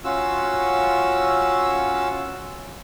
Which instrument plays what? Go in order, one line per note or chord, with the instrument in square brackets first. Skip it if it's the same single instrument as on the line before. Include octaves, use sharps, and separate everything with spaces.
[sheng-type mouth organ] C#4 F4 F#4 E6